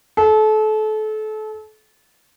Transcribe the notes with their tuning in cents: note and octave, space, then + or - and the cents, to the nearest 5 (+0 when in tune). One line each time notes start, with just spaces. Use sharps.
A4 -30